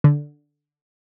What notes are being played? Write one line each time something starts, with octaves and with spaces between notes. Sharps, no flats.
D3